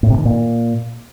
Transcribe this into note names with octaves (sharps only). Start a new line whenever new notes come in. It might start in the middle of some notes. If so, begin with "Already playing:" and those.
A2
C3
D#3
A#2